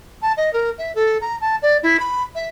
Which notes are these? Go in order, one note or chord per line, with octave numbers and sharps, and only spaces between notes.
A5
D#5
A#4
E5
A4
A#5
A5
D5
E4
B5
E5